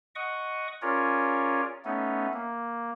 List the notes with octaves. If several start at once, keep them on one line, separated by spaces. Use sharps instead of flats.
D#5 F#5 C#6 D#6
C#4 F4 G#4 A#4 C#5 D5
A3 B3 C#4 D#4
A#3